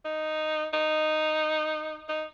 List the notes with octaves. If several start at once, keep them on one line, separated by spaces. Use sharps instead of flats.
D#4
D#4
D#4